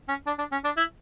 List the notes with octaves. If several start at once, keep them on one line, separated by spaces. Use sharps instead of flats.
C#4
D4
D4
C#4
D4
E4